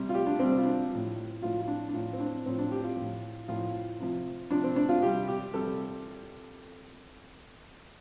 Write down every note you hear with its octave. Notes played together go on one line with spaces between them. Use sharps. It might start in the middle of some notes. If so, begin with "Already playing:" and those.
Already playing: C3 G3
F4
G4
D4
C3 G3 C4
F4
D4
A2 F3
A2 F3 F4
F4
D4
D4
A2 F3 F4
C4
D4
A2 F3 C4
D4
G4
F4
A2 F3
A2 F3 F4
C3 F3
C3 F3 D4
C4
D4
F4
C3 G3 G4
G4
C3 G3 A4